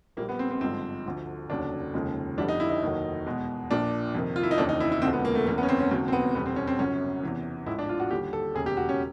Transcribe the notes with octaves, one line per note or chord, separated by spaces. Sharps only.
A#1 A#2 G3 A#3
B3
C4
C4
G#1 G2 D3 F3 G#3 C4
D2 D3 F3
F1 D#2 C#3 F#3 D4
F1 D#2 C#3 F3 G#3
G1 F2 D3 G3 D4
D#4
E4
D#4
F1 D#2 D#3 F#3
E2 B2 G#3
A#1 A#2 F3 D4
F2 C3 D#3
F4
E4
D#4
F1 D#2 C#3 E3 D4
D#4
E4
E4
E1 D2 D3 F3 G#3 C4
B3
A#3
A3
F#1 E2 C#3 A#3
B3
C#4
C4
C#4
E1 D#2 C#3 F#3 C4
C4
B3
F1 E2 B2 G3 B3
C4
C#4
C4
G1 F#2 C#3 F#3 C#4
E2 C3 E3
A1 G#2 F3 G#3 E4
D4
F4
F#4
D#2 D3 G3 G4
A4
E1 D#2 C#3 G#4
G4
F#4
C#4